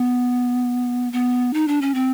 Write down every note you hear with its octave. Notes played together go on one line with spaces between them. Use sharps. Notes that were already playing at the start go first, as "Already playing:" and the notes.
Already playing: B3
B3
D#4
D4
C#4
C4